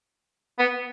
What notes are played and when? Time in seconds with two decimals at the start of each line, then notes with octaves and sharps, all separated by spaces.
0.59 B3